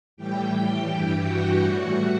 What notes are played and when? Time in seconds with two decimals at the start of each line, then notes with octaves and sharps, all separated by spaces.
0.17 A2 E3 G3 G4 G5
0.52 G4 G5
0.88 G2 E3 G3 G4 G5
1.23 F#4 F#5
1.59 A2 E3 G3